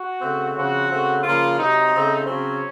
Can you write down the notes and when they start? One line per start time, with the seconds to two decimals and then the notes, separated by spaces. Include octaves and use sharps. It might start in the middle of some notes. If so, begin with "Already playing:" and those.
Already playing: F#4
0.20 C#3 A3 C4
0.55 C#3 F3 C4 F#4
0.88 C#3 A3 C4
1.23 C#3 F3 A#3 F4
1.57 C3 F#3 C4 D#4
1.93 C#3 A3 C4
2.27 C#3 F#3 C4 C#4